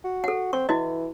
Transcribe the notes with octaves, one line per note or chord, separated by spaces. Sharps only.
F#4
A4 F#5
C4 C#6
E3 E4 F#4 D#5